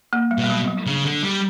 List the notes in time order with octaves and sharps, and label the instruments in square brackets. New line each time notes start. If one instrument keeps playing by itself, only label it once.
[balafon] A#3
G3
[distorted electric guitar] B2
[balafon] G3
F#3
F#3
[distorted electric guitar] C#3 [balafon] D4
[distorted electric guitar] D3
G3